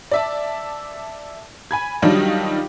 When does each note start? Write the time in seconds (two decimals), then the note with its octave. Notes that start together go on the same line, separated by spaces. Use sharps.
0.11 D5 E5 A5
1.71 G#5 B5 G#6
2.02 D#3 F#3 G3 D4 D#4 F4